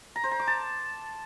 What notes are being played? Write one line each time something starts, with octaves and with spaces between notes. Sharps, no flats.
A#5
C5
A#5
D6
A5